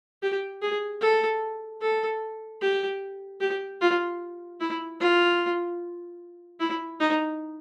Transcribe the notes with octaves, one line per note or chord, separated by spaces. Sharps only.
G4
G#4
A4
A4
G4
G4
F4
E4
F4
E4
D#4